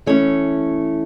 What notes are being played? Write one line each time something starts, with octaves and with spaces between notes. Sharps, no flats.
E3 A3 C#4 C#5